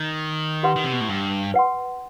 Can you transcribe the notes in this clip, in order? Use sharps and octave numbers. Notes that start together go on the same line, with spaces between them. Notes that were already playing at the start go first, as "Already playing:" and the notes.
Already playing: D#3
G4 B4 F#5 C6
D#3
C3
B2
A2
G2
B4 F#5 C6